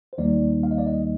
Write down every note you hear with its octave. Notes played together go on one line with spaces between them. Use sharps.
C5
D#2 D#3 G3 A#3 D#4 D5
F5
D#5
D5
D#5